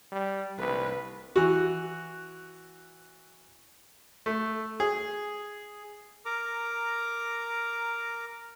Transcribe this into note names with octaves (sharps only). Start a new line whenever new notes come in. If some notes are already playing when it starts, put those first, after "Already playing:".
G3
C2 B4
E3 F#4
A3
G#4
A#4 A#5 D6